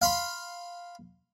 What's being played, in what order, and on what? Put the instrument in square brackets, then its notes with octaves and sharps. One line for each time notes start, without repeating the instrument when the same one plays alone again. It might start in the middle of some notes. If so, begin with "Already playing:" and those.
[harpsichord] F5 B5 C6